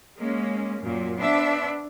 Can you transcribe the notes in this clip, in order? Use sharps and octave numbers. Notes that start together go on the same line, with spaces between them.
G#3 A#3 C#4
F#2 A#2
B3 D4 C5 E5